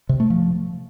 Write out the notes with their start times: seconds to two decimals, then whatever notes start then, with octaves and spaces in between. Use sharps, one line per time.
0.09 C3
0.20 A3
0.30 F3